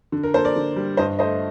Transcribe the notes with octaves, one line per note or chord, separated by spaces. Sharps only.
D3
A#4
A#3 A4 C5
A#4 D5
D3
G3
G2 C5 D#5
A3 C5 D#5